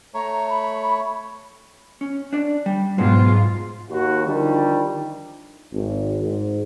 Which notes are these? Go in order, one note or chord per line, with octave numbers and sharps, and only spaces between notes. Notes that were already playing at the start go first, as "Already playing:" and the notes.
A3 C#5 A#5
B5
C#4
D4 D5
G3
G#2 B2 F#3 F4 C5
D#2 F#4
D3 D#3 F3 G3
G#1
G#2